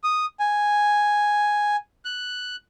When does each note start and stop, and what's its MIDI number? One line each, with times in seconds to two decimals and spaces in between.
0.04 0.26 87
0.40 1.76 80
2.05 2.56 90